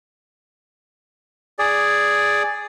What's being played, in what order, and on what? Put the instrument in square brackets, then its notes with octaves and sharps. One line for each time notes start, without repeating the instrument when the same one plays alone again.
[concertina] G#4 D5